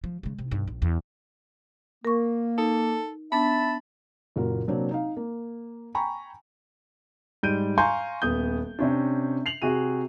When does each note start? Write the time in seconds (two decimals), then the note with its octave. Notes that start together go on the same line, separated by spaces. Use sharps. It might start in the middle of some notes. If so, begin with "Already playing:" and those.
0.04 F3
0.23 C#3 G#3
0.38 C3
0.51 B1 G2
0.67 A#1
0.82 E2
2.05 A#3 A#4 C#6
2.58 D#4 A4
3.32 B3 D4 E5 A5 B5
4.36 F#1 A#2 F#4 A#4
4.68 C3 F#3 A#3 C4 D4
4.91 D#4 F5
5.17 A#3
5.95 G5 G#5 A#5 B5 C#6
7.43 G#2 G3 G6 D7 D#7
7.78 F5 G#5 A#5 C6 C#6 G6
8.22 D#1 B3 D#6 G6
8.79 C3 C#4 D4
9.46 C7 F7 F#7
9.62 C3 F#4 G#4 D#7